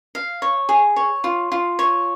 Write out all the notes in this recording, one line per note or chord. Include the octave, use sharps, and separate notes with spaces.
F5
C#5
G#4
C#5
F4
F4
C#5